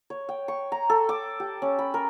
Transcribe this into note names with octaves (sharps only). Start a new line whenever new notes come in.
C#5
G5
C#6
A#5
A4
D6
G4
C#4
B5
A#4